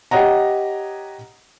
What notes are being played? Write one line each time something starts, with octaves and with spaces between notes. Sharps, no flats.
G4 C#5 D#5 F#5 A#5